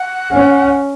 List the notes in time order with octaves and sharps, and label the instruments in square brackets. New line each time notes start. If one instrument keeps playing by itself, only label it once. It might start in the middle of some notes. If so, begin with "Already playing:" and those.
Already playing: [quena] F#5
[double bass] C#4